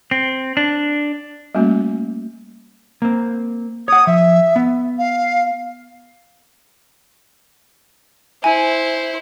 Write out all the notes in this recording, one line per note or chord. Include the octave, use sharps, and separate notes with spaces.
C4
D4
G3 A3 A#3 C#4 F#4
A#3 C4
C#5 F#5 D#6
F3 E5
B3
F5
E4 C5 G#5